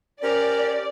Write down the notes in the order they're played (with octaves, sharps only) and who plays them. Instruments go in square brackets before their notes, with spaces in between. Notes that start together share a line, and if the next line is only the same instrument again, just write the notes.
[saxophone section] C#4 G4 C5 [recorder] A#4 [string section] D5